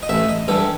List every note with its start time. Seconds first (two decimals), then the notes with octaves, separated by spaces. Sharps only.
0.03 D#5
0.09 A1 E5
0.29 D#5
0.48 G2 E3 G3 A4